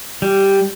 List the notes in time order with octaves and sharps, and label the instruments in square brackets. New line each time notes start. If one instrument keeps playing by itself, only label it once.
[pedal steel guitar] G3